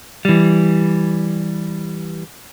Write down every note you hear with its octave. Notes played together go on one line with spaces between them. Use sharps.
E3 G3